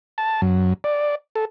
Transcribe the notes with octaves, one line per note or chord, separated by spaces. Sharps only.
A5
F#2
D5
A4